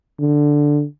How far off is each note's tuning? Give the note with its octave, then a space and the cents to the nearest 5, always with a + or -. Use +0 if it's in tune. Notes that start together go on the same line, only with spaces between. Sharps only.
D3 +0